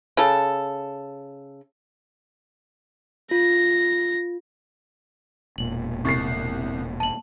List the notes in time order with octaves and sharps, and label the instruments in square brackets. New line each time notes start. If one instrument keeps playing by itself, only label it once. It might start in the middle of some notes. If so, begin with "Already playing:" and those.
[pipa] C#3 A4
[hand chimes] F4 [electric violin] A#6
[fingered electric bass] E1 A#2 [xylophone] F#7
[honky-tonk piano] C2 C7 [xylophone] C#6 A6
[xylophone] A5 F#7